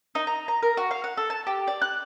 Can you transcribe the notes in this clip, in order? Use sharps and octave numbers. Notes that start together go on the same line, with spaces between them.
D#4
A#5
A#5
A#4
F#4
F5
F#5
A4
A5
G4
D5
F#6